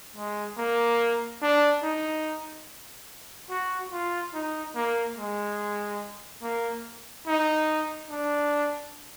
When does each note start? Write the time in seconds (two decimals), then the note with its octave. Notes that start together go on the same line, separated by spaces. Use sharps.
0.16 G#3
0.58 A#3
1.42 D4
1.83 D#4
3.50 F#4
3.92 F4
4.34 D#4
4.75 A#3
5.17 G#3
6.43 A#3
7.27 D#4
8.10 D4